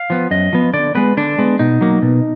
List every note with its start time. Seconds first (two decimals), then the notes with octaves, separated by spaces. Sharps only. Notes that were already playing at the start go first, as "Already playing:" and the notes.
Already playing: F5
0.10 F3 B3
0.31 F#2 D#5
0.53 F3 B3
0.73 D3 D5
0.95 G#3 B3 B4
1.17 D3 D4
1.38 G#3 B3
1.59 B2 D#4
1.81 F#3 A#3
2.02 B2